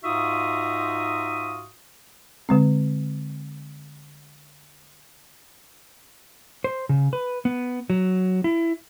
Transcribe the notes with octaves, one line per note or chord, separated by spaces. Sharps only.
G#2 D#4 F4 F#4 E5 D#6
D3 G#3 C4
C5
C#3
B4
B3
F#3
E4